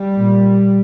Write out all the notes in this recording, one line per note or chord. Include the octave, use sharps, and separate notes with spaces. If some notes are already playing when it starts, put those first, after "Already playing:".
Already playing: G3
A#2